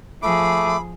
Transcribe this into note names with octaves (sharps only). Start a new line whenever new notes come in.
F3 A3 G#4 B5 D6